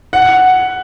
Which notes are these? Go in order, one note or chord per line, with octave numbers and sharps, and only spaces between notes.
F#5